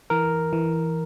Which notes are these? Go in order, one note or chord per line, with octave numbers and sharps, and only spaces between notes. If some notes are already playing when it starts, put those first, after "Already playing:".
E3 A#4
E3